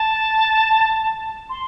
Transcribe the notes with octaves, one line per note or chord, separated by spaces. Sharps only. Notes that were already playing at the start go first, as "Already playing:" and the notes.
Already playing: A5
C6